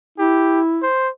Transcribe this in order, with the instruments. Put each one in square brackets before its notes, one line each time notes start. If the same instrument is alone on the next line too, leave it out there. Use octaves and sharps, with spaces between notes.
[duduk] E4 [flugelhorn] G4
[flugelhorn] C5